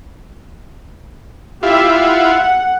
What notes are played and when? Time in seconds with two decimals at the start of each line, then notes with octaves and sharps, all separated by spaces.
1.63 E4 F4 G4 E5
1.95 F#5